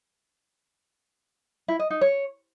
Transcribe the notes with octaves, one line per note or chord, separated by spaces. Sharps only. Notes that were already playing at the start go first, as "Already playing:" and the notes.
E4
D#5
D#4
C#5